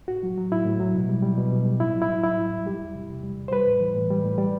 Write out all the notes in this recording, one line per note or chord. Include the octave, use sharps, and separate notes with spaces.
A2 F#4
F#3
F#3
A2 E4
A2
F#3
B2
G3
G3
B2
B2
G3
A2 E4
F#3
E4
F#3
A2 E4
A2
F#3
G3 G4
E2
C3
E2
G3
E2
C5
G3 B4
A2
E3
A2
G3
A2
G3